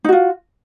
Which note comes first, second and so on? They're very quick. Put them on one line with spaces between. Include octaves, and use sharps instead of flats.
D#4 F#4 F4